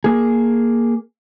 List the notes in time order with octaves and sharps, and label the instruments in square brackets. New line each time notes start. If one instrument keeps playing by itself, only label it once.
[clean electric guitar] A#3 G#4